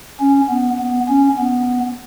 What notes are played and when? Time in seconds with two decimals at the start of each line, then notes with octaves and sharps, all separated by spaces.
0.20 C#4
0.49 B3
0.79 B3
1.08 C#4
1.38 B3